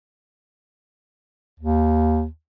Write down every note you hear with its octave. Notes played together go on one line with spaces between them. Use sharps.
D#2